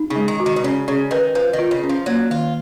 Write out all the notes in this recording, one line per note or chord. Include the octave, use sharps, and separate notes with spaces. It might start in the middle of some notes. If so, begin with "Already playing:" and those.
Already playing: D#4
C#3
G#3
D#3
F#4
D#3
B2
C#3 C#4
C#3 C#4
D#3 B4
F3 B4
D#3
F4
C#3
C#4
F3
F#3 A#3
D#3 F4